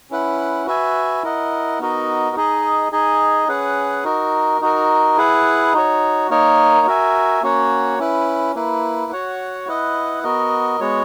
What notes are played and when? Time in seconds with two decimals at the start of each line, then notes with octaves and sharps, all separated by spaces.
0.11 C#4 E4 B4 F#5
0.66 F#4 B4 E5 G#5
1.24 E4 A#4 D#5 F#5
1.80 B3 D#4 F#4 A#4 D#5
2.36 D#4 G#4 D#5
2.92 D#4 G#4 D#5 G#5
3.48 C#4 G#4 B4 F#5
4.04 D#4 F#4 A#4
4.61 D#4 F#4 A#4
5.17 E4 G#4 B4 F#5
5.74 D#4 F#4 C#5
6.30 A#3 D#4 A#4 C#5
6.86 F#4 A#4 E5 G#5
7.42 A#3 C#4 F#4 C#5 F#5
7.99 C#4 E4 B4
8.55 A#3 E4 B4
9.12 F#4 C#5 F#5
9.68 E4 B4 D#5 F#5
10.24 B3 F#4 A#4 D#5
10.81 G#3 B3 F#4 C#5